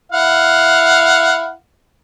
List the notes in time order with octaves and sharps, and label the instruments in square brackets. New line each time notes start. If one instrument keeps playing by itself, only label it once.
[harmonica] E4 F5 F#5